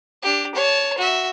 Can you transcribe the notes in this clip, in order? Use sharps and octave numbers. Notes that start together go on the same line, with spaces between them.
D4 G4
C#5 A5
F#4 E5